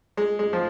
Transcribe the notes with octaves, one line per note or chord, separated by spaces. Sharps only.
G#3
G#3
F3